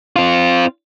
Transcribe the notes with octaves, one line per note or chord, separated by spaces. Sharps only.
C4 F4